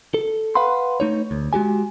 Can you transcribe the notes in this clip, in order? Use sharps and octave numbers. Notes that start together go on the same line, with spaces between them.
A4
B4 F5 F#5 B5 C6
A3 D#4 C#5
D2
G#3 F#4 G4 G#5